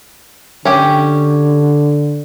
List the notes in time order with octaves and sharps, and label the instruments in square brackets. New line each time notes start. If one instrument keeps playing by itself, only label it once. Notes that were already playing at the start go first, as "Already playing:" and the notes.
[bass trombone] D3 [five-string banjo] C#4 G4 G5